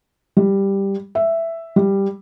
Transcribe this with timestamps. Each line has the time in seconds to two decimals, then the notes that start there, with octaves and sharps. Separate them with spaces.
0.37 G3
1.15 E5
1.76 G3